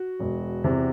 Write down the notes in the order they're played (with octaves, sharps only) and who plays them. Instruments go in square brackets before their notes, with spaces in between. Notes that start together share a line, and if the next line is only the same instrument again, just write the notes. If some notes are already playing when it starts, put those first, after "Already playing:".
Already playing: [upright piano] F#4
E1
E2 C3